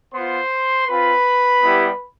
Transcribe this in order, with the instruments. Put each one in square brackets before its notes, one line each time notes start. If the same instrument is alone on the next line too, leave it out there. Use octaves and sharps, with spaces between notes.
[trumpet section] B3 F4 C5 C6
C4 F4 B4 B5
G3 B3 E4 G4